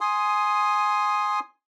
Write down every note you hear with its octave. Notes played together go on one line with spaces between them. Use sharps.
G#5 C6 D#6